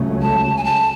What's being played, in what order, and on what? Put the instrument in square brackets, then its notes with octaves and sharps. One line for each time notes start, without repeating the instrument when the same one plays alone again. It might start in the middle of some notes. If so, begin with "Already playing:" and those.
Already playing: [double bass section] C#2 C#3 F#3 A3 C#4
[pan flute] A5
G#5
A5